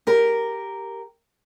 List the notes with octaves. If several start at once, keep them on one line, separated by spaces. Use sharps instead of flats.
G4 A#4